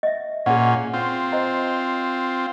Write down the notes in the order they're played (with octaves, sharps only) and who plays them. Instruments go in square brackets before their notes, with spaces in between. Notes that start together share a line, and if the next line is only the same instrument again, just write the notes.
[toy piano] D#5 E5
[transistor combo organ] A#2 C#4 [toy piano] G#4 F#5
[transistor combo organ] C4 F4
[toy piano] C5 D#5 A#5